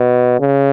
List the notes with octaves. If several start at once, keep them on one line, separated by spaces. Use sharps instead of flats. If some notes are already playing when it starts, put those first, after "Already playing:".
Already playing: B2
C#3